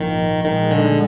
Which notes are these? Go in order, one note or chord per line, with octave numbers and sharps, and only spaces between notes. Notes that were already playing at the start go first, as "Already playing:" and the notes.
Already playing: A#1 G#2 D#3 F3 A#3
A#1 A#2 D#3 G#3
D3